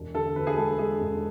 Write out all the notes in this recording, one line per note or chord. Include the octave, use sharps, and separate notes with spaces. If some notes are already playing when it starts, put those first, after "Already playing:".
Already playing: E1
D3 A4
D2 B4
G#4
G#3 A4
G#3 G#4
E1